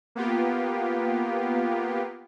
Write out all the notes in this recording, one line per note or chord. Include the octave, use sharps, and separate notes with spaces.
A#3 B3 F4 G4